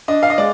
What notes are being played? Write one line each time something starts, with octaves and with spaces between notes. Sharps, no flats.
D4 D#5
F5
D#5
G#3 D5